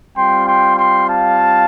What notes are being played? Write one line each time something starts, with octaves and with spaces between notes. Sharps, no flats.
G3 C4 F4 G5 C6
G5 C6
G5 C6
F5 A5